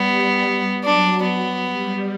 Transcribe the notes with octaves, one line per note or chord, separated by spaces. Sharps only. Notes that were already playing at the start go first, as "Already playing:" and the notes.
Already playing: G3 B3
F#3 D4
B3
G3